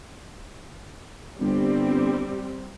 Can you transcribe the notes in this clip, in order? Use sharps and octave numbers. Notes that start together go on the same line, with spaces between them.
G1 G3 C4